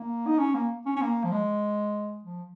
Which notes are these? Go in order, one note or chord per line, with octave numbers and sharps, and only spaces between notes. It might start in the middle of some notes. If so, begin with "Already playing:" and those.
Already playing: A#3
D#4
C#4
A#3
C#4
C#4
A#3
F3
G#3
F3